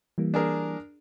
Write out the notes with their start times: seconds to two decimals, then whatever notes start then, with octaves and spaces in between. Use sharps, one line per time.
0.18 E3 G3 A#3
0.34 D4 G#4 A#4